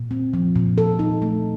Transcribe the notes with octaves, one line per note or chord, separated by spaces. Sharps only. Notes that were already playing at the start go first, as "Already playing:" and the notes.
Already playing: A#2
C4
F3
A#2
A4
D#4
A3